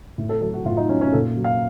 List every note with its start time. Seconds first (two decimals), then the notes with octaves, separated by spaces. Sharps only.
0.18 A2
0.29 A4
0.41 F#3 A4
0.54 F#4
0.65 A2 F4
0.77 D#4
0.89 F#3 C#4
1.01 C#4
1.13 A#2 A4
1.37 F#3
1.44 F5